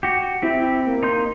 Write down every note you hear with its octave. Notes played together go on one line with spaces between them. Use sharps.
F#4 G4
C4 E4 G4
A#3
D#4 C6 G6